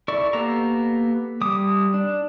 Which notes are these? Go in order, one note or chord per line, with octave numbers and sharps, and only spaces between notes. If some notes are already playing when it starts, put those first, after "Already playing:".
E4 A4 D5 C#6
A#3 B3 G4 A4 A#5
G3 D6 D#6
D4